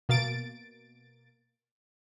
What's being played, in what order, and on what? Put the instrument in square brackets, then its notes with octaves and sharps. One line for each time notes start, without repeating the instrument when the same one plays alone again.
[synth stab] B2 A#3 A6 D7